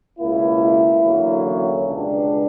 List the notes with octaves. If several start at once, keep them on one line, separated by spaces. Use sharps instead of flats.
C#2 B2 A#3 E4
E2 D3 F#3 A#3
C#4
C#2 B2 G3 D4